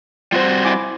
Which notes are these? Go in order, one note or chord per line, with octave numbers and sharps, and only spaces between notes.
G3 C4 F4 F#4 C5
E4 G#5 D6